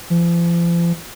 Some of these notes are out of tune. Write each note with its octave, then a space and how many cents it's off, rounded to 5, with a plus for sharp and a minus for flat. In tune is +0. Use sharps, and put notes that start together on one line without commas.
F3 -40